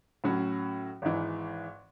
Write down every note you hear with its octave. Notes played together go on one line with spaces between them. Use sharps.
A2 F#3 C#4 F#4
G#1 G#2 E3